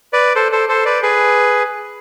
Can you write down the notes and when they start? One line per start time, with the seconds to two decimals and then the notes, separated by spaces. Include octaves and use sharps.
0.13 B4 D5
0.35 A4 C5
0.52 A4 C5
0.69 A4 C5
0.85 B4 D5
1.02 G#4 B4